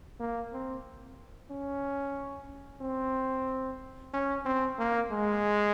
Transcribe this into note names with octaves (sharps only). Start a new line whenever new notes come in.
A#3
C4
C#4
C4
C#4
C4
A#3
G#3